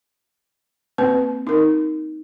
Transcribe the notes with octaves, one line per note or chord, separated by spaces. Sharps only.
A#3 C4 B4
D#4 A#4